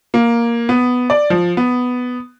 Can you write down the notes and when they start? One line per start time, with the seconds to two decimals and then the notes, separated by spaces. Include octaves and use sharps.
0.14 A#3
0.69 B3
1.10 D5
1.30 F3
1.57 B3